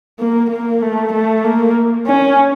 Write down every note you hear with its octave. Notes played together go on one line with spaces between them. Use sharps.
A#3
A#3
A3
A3
A#3
C#4